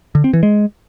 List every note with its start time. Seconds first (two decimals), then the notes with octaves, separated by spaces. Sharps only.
0.15 D3
0.24 C4
0.33 E3
0.43 G#3